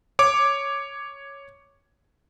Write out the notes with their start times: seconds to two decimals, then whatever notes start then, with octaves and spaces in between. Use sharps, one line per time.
0.19 C#5 D6